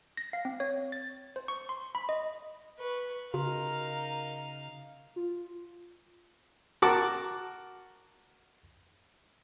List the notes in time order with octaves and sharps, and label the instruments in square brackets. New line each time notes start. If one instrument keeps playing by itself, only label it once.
[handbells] A#6
F5
C4
C#5
A6
C5
C#6
C6
B5
D#5
[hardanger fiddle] B4 C#6
[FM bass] C#3 [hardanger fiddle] D#4 F5 [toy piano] F#4 [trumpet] A#4
[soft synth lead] F4
[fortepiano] F#4 A#4 A5 D6